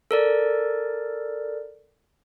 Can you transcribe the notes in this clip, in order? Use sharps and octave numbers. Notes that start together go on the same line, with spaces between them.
A4 A#4 D5